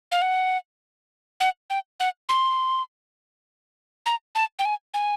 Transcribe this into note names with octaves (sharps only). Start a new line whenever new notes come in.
F5
F#5
F#5
G5
F#5
C6
A#5
A5
G5
G#5
G#5